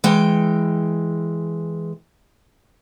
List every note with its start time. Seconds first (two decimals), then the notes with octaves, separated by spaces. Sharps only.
0.04 E3 G#3 G5